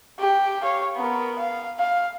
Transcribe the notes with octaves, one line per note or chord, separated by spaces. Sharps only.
G4
C#5 F5
B3 A#4
F5
F5